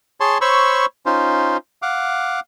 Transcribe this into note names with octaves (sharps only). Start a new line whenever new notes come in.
G#4 C#5 A5 C6
C5 C#5 B5 C#6 E6
C#4 D#4 F4 C5
F5 F#5 D6